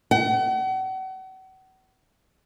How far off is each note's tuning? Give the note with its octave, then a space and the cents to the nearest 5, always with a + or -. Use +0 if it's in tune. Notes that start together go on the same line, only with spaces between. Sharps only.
F#5 +40